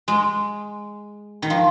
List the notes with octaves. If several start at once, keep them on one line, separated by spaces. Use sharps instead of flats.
G#3
D#3
F3